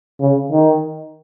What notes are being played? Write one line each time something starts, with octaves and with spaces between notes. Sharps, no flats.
C#3
D#3